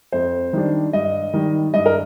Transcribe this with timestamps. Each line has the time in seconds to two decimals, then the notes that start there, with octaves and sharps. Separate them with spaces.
0.12 F2 C5
0.53 D#3 G3 D4
0.93 G2 D#5
1.33 D#3 G3
1.74 G2 D#5
1.86 A#4